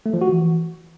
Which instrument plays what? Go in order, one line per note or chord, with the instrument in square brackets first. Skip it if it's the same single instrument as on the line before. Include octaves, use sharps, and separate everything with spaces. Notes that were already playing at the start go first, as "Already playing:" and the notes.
[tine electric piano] A3
F3
F#4
E3